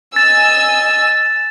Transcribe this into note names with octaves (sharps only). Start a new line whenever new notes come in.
D#5 G#5 E6 A6 E7